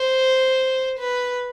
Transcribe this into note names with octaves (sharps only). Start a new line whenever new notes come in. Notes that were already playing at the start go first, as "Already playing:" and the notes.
Already playing: C5
B4